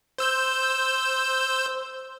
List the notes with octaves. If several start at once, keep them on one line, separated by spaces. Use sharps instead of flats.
C5 E6 G6